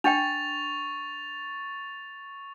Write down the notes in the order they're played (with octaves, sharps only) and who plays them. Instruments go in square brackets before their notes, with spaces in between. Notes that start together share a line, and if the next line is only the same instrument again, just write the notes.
[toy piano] D4 G5 [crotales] C#6 A6 F7